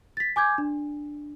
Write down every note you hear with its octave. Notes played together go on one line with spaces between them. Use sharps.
A6 B6
G#5 D6 G6 G#6
D4